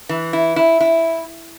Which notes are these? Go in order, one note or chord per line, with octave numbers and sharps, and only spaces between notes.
E3
E4
E4
E4